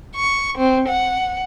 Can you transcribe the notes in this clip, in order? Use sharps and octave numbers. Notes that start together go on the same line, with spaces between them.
C#6
C4
F#5